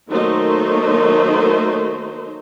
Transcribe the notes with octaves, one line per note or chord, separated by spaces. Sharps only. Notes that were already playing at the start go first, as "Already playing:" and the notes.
D#3 F#3 A3 A#3 D#4 C5